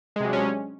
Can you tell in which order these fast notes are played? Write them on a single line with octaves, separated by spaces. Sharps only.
G#3 C3 F#3 D4 C#4